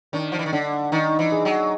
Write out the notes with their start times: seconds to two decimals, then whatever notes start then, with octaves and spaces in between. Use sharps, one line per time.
0.13 D#3 D4
0.32 F3
0.39 E3
0.46 D#3
0.53 D3 D4
0.92 D#3 D#4
1.19 E3
1.32 G#4
1.45 F#3